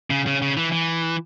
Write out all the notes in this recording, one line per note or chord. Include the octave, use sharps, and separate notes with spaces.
C#3
C#3
C#3
E3
E3